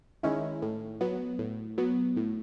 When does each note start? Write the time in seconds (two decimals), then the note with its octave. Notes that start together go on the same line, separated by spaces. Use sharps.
0.23 D#3 G#3 C#4 E4
0.62 A2
1.01 F#3 B3
1.39 A2
1.78 F#3 B3
2.17 A2